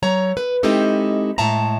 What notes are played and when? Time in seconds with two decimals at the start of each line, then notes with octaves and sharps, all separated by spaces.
0.03 F#3 C#5 A#5
0.37 B4
0.63 G#3 C4 D#4 E4 G4 A4
1.38 A2 G#3 E5 A5 A#5